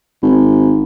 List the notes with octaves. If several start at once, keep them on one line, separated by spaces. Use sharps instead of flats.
G#1